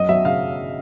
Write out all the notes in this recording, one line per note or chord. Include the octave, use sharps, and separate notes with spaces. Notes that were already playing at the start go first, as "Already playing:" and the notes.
Already playing: F#2 D#5
F#3 E5
C#3 F5